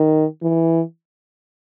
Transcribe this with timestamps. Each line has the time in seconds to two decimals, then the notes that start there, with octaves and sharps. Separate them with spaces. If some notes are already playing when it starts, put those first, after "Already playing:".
Already playing: D#3
0.42 E3